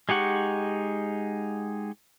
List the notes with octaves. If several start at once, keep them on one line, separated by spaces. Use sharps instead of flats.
G#3 D#4 G4 F#5 C#6